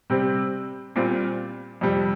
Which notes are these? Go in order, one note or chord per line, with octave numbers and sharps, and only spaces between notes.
C3 G3 C4
A#2 G3 C4 F4
F2 C3 G3